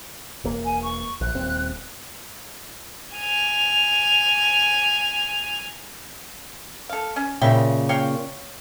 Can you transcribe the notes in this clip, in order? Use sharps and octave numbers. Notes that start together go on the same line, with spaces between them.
E1 A#3
G#5
C#6
A#1 F#6
D#1 C4
G#5 F7
A4 F5
C#4
A#2 C#3 E5 G5
C#5 F5 G5